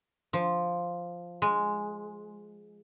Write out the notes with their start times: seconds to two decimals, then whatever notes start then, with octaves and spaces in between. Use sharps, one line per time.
0.33 F3
1.42 G#3